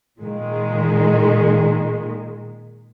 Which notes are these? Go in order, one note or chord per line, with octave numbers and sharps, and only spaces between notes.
A#2 D#3 G#3